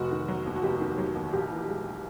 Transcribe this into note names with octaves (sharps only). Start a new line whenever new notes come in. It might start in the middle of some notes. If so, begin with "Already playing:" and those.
Already playing: F1 F#4
D#3
F#3
D#2
F#4
F1 G4
D#3
F#3
D#2
A#1 G4
E3
G#3